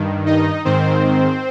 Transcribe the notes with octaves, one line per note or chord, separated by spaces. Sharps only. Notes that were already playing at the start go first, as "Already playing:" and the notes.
Already playing: G2 D#3
D#4 D#5
G#2 D#3 C4 C5